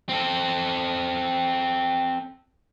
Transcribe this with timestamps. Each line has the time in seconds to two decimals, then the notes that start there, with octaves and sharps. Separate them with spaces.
0.09 C4 A4